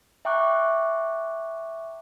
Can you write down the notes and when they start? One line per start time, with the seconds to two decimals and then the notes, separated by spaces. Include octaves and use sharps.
0.25 E5 G5 A#5 C#6 D6 F#6